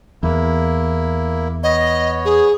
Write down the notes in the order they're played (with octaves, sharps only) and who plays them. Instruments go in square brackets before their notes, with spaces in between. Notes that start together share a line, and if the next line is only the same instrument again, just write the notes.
[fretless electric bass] E2 [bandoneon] A#3 E4
[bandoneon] B3 C#5 [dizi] D#5
[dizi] G#4